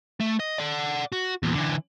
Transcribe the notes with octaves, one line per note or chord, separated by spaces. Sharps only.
A3
D#5
D5 F#5
F#4
E2 A#2
D3 E3